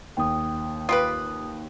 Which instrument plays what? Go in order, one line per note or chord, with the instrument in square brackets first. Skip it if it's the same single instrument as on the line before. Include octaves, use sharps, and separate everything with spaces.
[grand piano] D#2 [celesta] G5 D#6
[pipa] F4 G4 B4 [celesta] D#6